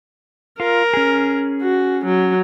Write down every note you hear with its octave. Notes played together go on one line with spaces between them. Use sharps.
F4 A#4
C#4 G#4
F#4
F#3